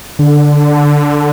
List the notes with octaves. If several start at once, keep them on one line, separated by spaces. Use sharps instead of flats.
D3